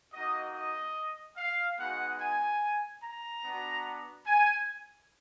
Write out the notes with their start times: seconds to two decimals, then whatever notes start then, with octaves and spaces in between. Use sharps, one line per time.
0.13 A#3 D#4 F#4 D#5
0.54 D#5
1.37 F5
1.78 G#3 B3 D#4 F#4 F#5
2.19 G#5
3.02 A#5
3.43 B3 D4 F#4
4.26 G#5